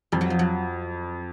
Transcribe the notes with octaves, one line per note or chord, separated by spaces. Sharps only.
F2 G3
F#3
F3
F#3